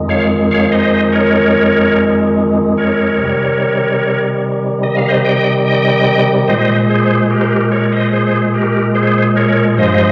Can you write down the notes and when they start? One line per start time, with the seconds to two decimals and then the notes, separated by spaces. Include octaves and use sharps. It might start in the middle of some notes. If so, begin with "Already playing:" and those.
Already playing: F2 D#3 G#3
0.09 C#5 F5
0.51 C#5 F5
0.72 C5 D#5
1.12 A#4 C#5
2.77 A#4 C#5
3.18 C3 D#3 G3
4.83 D#5
4.96 F5
5.08 C5 D#5
5.25 D#5 G5
5.66 D#5 G5
6.48 A#2 G#3 C5 D#5
6.89 G#4 C5
7.30 G4 A#4
7.41 C5
7.51 G4 A#4
7.72 A#4 C#5
7.92 C5 D#5
8.13 G#4 C5
8.54 G4 A#4
8.95 G#4 C5
9.36 A#4 C#5
9.77 G2 F3 G#3 C5 D#5